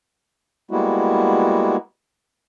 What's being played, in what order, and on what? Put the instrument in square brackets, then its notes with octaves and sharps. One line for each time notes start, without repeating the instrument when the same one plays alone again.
[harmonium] G3 G#3 A#3 B3 E4 F#4